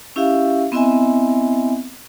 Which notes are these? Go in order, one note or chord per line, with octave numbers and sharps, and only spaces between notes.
C#4 E4 G4 E5 F5
B3 C4 E4 D#5 E5 G#5